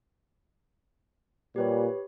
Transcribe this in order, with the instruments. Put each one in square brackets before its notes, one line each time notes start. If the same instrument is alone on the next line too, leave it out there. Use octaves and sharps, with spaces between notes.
[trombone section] A#2 G3 [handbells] G4 B4 C#5